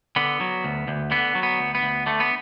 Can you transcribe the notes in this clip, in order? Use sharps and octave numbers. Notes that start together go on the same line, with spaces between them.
D3 B3
F#3
D2
D2
D3 B3
F#3
B3
D2
B3
D2
D3 A3
B3